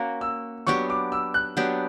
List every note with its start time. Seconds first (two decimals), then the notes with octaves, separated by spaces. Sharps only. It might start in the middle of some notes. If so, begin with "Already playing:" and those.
Already playing: A#3 C#4 F#4 A#4
0.21 E6
0.67 F#3 B3 D4 G4 C#6
0.90 D6
1.12 E6
1.34 F#6
1.57 F#3 B3 D4 G4